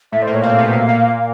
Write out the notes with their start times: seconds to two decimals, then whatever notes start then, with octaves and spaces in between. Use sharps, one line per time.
0.12 A2 A3 E5
0.22 C5
0.27 A#2 A#3
0.33 C#5
0.42 C3 C4 F5
0.58 B2 B3
0.73 A#2 A#3
0.89 A#2 A#3